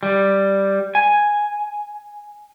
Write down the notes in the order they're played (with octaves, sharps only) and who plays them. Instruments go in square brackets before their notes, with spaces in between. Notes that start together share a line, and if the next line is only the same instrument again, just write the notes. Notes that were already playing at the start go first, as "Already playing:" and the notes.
[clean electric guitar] G3
G#5